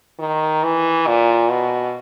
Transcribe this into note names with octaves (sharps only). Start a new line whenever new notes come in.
D#3
E3
A#2
B2